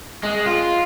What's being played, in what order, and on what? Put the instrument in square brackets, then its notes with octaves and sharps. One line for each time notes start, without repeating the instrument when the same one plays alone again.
[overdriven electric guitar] G#3
F4